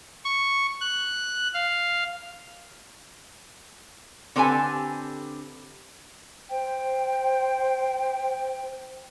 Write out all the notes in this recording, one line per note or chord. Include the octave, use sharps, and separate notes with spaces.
C#6
F#6
F5
D3 C4 G4 A4 B4 G#5
C5 G5